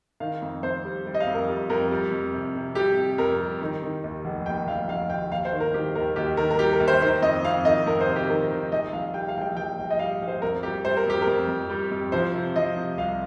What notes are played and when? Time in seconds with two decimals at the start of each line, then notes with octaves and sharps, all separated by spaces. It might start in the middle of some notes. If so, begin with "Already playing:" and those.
0.20 D#3 F5
0.42 F2
0.63 F2 C5
0.85 G3
1.06 G3
1.14 D#5
1.20 F5
1.27 F2
1.34 A#4
1.49 G3
1.70 F2 A#4
1.91 G3
2.12 F2
2.33 C3
2.55 C3
2.75 G3 G4
2.97 C3
3.18 F2 A#4
3.40 G3
3.61 D#3
3.83 D#3
4.04 D#2
4.25 F1
4.46 D#2 G5
4.67 F1 F5
4.88 F1 F5
5.10 D#2 G5
5.31 D#2 F5
5.45 C5
5.53 D#3
5.60 A#4
5.74 D#3 G4
5.95 D#2 A#4
6.16 D#2 G4
6.37 D#3 A#4
6.51 A#4
6.59 G3 G4
6.73 A#4
6.80 D#2
6.88 C5
7.01 D#3 C5
7.22 F2 D#5
7.44 F2 F5
7.65 D#3 D#5
7.87 F2 A#4
8.01 C5
8.09 C3
8.16 G4
8.29 D#3 A#4
8.51 D#3
8.72 A#1 D#5
8.93 A#1 F5
9.14 G3 G5
9.28 F5
9.37 A#1 G5
9.57 A#1 G5
9.79 A#1
9.90 D#5
9.99 G3 F5
10.22 A#1
10.28 C5
10.42 F2 A#4
10.63 G3 G4
10.85 G3 C5
10.97 A#4
11.06 F2 G4
11.22 A#4
11.27 F2
11.48 F2
11.70 G3
11.91 F2
12.12 F3 C5
12.34 C3
12.56 F3 D#5
12.76 C3
12.97 C2 F5